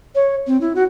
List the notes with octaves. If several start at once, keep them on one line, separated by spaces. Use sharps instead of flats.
C#5
C4
E4
F#4